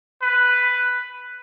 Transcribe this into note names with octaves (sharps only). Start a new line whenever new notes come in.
B4